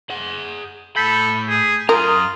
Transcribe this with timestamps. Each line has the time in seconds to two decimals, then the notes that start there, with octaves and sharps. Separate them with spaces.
0.10 G#4 F#5
0.96 A2 A4 B5 G6 B6
1.49 G#4
1.89 F#2 F4 A#4 A#5 D#6